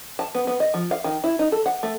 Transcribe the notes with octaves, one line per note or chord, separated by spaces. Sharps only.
A5
B3
B3
D#5
F3
F5
D#3
E4
D#4
A4
F#5
A3